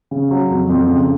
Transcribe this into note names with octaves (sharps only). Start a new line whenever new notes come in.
C#3
F#3
F2
F2
C#3